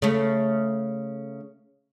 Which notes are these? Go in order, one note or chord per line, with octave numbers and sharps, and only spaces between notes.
C#3 A3